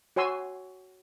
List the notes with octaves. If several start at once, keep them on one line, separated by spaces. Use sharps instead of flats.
F#4 C#5 G#5 C6 E6